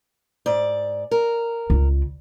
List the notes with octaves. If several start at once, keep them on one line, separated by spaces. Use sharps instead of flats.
G#2 D5
A#4
C#2